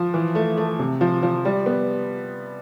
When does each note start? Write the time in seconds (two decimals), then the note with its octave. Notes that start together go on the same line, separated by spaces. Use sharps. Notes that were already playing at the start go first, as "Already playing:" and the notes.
Already playing: F3
0.14 E3
0.35 A3
0.57 A3
0.79 C3
1.01 F3
1.23 F3
1.45 G3
1.66 B3